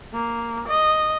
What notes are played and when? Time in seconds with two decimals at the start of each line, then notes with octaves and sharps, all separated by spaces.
0.14 A#3
0.68 D#5